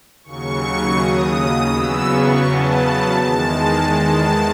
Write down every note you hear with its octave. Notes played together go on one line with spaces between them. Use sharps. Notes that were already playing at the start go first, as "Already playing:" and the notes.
D#2 C#3 F#3 C#6
D#6
E2 C#3 F#3 B3 E6
C#6
A5
E2 D#3 G#3 A5
A5